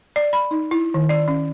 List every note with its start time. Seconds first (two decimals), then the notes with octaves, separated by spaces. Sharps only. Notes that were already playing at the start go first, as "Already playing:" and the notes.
0.16 D5
0.33 B5
0.51 D#4
0.71 E4
0.94 D#3
1.09 D5
1.28 C#4